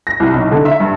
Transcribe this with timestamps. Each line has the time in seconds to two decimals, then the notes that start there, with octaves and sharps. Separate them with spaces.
0.07 A#6
0.20 C2
0.34 B1
0.51 D3
0.65 E5
0.80 G2